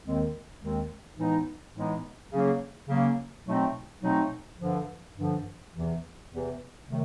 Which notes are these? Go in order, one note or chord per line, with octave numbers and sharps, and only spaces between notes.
D#2 D#3 G#3 C4
D#2 D#3 G#3 C4
A2 E3 G#3 B3 D#4
A2 E3 G#3 B3 D#4
C#3 F#3 A#3 C#4
C#3 F#3 A#3 C#4
B2 F#3 A3 C4 D#4
B2 F#3 A3 C4 D#4
G2 D3 F3
G2 D3 F3
E2 C3 E3
E2 C3 E3
C3 D#3 F#3 A3